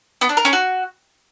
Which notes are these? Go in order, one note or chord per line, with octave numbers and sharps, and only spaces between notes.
B3
D4
A#4
C#4
F#4